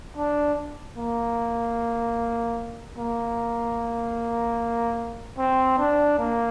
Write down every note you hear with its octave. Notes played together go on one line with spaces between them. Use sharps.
D4
A#3
A#3
C4
D4
A#3